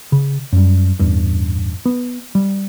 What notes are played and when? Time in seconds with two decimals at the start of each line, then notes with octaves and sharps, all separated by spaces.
0.12 C#3
0.53 F#2 G3
0.99 A1 E2 G2
1.86 B3
2.35 G3